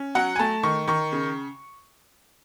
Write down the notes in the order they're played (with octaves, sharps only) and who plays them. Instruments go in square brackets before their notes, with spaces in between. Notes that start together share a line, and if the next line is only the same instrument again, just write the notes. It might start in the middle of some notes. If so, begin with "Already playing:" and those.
Already playing: [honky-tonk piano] C#4
F#3 F#5
G#5
A3 A5
D#3 C#6
D#3 C#6
C#3